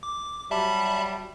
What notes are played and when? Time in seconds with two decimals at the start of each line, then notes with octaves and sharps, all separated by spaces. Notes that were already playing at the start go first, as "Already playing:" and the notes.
0.03 D6
0.51 F#3 G3 E5 A5 B5